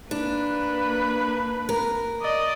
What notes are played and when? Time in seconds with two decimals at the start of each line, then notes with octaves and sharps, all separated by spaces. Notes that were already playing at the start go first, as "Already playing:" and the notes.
0.11 A#3 D4 B4
1.69 A#4
2.22 D5 D#5